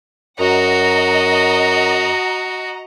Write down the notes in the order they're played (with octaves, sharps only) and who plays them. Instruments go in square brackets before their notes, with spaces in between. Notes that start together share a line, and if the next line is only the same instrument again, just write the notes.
[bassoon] F#2 [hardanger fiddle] F#4 [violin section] D#5 F#5 A#5